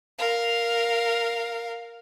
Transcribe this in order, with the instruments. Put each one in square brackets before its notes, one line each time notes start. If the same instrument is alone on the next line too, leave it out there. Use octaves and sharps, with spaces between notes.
[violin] A#4 F5